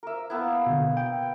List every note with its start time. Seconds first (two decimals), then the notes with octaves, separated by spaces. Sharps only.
0.03 A#4 E5
0.30 A#3 B3 E4
0.67 B2 D3
0.97 G5